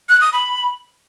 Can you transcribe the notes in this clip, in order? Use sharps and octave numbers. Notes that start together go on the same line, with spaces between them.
F#6
D#6
B5